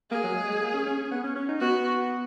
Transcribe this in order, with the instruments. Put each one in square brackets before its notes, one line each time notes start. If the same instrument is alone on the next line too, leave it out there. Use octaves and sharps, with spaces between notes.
[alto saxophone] A#3 [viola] G#4
[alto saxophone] F#3
G#3
G#3
A#3
C#4
C#4
C#4
B3
C#4
C#4
D#4
[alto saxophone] B3 [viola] F#4